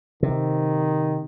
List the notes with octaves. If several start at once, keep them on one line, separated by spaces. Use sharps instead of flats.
C3 D#3